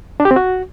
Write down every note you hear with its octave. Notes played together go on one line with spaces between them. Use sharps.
D4
G4
C4
F#4